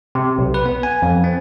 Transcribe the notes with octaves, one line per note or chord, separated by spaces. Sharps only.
C3
B1
B4
B3
G#5
F2
C4